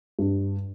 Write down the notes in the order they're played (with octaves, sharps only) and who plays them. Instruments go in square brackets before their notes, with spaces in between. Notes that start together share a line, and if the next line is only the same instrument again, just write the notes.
[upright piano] G2